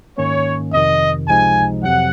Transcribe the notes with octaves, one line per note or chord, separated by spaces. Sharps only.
G#2 D#3 A#3 C#4 C#5
F2 C3 D#3 D#5
C#2 C3 F3 G#3 D#4 G#5
F2 C3 F#3 F#5